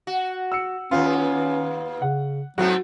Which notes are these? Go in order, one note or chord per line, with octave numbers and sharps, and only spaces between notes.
F#4
E6 C#7
D#2 B3 C#4 F4
C#3 F#5
G#2 F#3 A3 C4 F#4